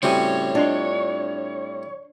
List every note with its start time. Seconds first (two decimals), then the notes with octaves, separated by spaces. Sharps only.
0.03 A2 C#3 G3 C4 F#4 C#5 G#5
0.55 D4 F4 D#5 C6